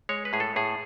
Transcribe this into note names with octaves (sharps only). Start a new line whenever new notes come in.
G#3 C#5
B4
A2 G#4
A4
A2 G#4